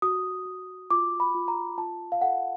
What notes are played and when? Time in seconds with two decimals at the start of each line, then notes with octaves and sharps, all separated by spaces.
0.02 F#4 D#6
0.45 F#4
0.91 F4 D6
1.20 B5
1.35 F4
1.48 A#5
1.77 F4 A5
2.12 F5
2.21 A4 F#5